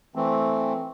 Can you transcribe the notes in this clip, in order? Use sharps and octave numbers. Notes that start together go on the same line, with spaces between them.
E3 A3 C4